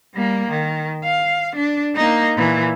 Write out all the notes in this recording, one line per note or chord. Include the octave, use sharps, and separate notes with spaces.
G3 A#3
D#3
F5
D4
A#3 D#4
A#2 E3